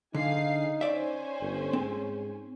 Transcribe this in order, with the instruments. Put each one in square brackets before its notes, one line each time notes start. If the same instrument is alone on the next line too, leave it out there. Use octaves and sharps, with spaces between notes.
[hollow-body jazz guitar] D3 [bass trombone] D#4 [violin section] G#4 F5 C7
[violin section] C#4 C5 G#5 [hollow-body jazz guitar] D5 E5
[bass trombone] G1
[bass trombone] G#2 [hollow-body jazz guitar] C4